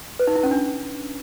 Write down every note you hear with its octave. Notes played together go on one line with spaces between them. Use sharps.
B4
D#4
E4
C#4
D4